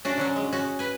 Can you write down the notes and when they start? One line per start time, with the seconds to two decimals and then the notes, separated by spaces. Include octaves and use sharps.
0.05 C#4 D4 F#4
0.18 D3 F#3 C#4
0.36 G#3
0.52 C#4 F#4
0.79 B4 G#5